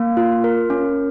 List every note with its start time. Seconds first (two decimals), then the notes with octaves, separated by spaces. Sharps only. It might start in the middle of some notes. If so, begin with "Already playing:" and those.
Already playing: A#3
0.17 F4
0.44 A#4
0.70 C#4